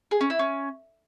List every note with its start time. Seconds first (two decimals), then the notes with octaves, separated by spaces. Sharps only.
0.11 G#4
0.21 C#4
0.30 E4
0.39 C#4